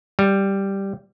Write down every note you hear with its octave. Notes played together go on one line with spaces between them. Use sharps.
G3